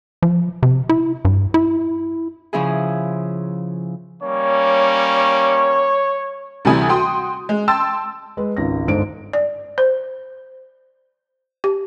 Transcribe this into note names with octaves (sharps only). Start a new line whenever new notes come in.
F3
C3
E4
G2
E4
C#3 F3 C#4 E4 G#4
G3 A#3 C#4 C#5
D2 C3 E3 G3 G#5 D#6
F#4 G5 C6 D#6
G#3
G5 A5 C6 E6 A6
G#3 B4
G#1 C#2 A#6
G1 G#2 D4 C5 D7
D5
C5
G4